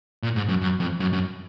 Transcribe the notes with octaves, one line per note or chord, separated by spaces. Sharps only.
A#2
G#2
F#2
F#2
F2
F#2
F#2